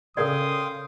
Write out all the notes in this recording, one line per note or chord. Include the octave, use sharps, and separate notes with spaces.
C#3 A4 A#4 D5 F5 G5 C6 D#6